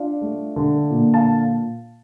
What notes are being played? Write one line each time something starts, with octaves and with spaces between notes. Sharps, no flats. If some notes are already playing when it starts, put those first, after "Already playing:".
Already playing: D4 F4 D5 F5
A3
D3
A#2
F5 A5